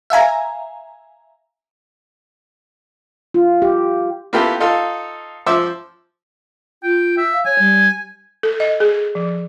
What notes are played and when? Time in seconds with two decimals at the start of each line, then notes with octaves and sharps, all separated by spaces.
0.10 E5 F5 G#5 A#5
3.34 F4
3.62 G4
4.33 A#3 B3 E4 F4 G4 A4
4.60 D#4 F4 A4 F5 A5
5.46 F3 C5 E5 D6 E6
6.83 F4 G5
7.18 E5
7.33 F5
7.46 C#5 G#5
7.59 G3
8.43 A4
8.60 D#5
8.80 G#4
9.15 F3